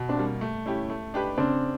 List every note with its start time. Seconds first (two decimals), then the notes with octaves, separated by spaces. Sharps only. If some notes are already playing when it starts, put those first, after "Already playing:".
Already playing: B2
0.09 C4 D4
0.17 G3 A#3
0.41 A3
0.66 C#4 E4 G4
0.90 A3
1.14 D4 G4 B4
1.38 C#3 C4 D4